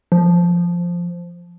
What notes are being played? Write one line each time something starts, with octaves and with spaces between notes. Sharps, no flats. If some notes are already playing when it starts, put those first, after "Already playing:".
F3